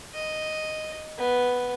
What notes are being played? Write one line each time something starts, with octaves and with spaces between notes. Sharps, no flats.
D#5
B3